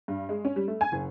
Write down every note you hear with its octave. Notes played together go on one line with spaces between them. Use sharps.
G2
G#3
C#4
G3
A3
G#5
F#1